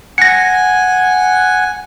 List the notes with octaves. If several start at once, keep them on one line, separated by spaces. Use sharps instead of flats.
F#5 G#5 A#6 C#7